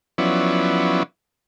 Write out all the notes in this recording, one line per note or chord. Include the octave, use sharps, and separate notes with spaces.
F3 F#3 B3 C#4 E4 D5